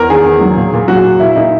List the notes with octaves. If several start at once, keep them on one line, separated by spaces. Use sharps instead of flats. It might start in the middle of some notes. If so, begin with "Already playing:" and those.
Already playing: E2 A#4
D#3 G#4
E2
F#3
A#2
A#2
F#3 F#4
A#2
A#2 E4
A#2 D#4